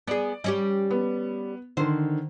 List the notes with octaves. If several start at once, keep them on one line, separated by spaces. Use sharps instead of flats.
B3 G#4 D5
G3 C#4 G4
B3
D3 D#3 C5